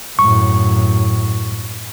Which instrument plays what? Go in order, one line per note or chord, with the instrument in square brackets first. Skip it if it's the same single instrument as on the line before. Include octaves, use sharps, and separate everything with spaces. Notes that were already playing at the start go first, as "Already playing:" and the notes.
[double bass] F#2 A2 [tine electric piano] C#6